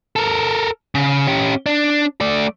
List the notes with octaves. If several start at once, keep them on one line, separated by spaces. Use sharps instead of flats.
A4 A#4
C#3
C#4 G4
D4
A3 D5